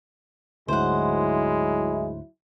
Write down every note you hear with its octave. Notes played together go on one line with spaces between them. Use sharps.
D2 G#2 F#3 G#3 E4 C5 F#5